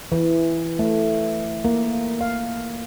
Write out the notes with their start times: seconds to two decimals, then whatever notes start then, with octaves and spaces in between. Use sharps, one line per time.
0.12 E3
0.79 A3
1.65 A#3
2.21 F5